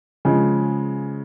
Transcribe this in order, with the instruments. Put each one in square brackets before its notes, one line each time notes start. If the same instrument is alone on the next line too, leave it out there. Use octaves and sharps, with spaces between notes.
[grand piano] C#3 F3 G#3